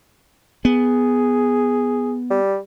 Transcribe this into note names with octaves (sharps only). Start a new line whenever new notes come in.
B3 G#4
G3